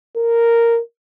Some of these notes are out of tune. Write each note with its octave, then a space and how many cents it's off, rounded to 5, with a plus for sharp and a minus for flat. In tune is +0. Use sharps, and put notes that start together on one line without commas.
A#4 -5